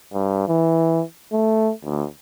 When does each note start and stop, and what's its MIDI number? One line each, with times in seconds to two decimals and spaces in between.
0.13 0.45 43
0.48 1.02 52
1.32 1.71 57
1.84 2.06 38